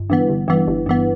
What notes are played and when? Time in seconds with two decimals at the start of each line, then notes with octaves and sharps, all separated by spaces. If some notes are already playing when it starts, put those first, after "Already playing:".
Already playing: G1
0.10 G2 E3 B3
0.29 G1
0.48 G2 E3 B3
0.67 G1
0.86 G2 E3 B3